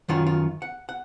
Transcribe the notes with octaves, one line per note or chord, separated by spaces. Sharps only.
F#2 D#3 F#3 F4
F4
F#5
F#5